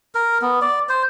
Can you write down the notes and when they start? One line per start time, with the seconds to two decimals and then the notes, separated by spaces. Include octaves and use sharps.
0.15 A#4
0.42 B3
0.61 D5
0.89 C5